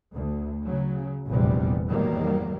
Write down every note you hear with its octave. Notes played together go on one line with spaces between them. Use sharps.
D2
C#3 F#3
F1 A#1 E2 C3 G3 B3
E2 G#2 D#3 F#3 G3 A#3